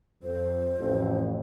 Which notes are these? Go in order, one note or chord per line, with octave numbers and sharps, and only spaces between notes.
F2 C5
A1 F2